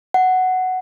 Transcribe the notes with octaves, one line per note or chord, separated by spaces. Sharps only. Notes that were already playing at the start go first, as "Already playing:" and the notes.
F#5